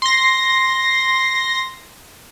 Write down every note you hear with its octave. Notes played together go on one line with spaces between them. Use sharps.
C6 A#6